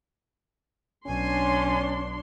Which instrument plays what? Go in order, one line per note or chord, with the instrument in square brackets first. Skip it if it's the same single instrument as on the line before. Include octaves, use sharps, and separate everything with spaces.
[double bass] B1 [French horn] C#4 [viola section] D4 C#5 C6 [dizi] G#5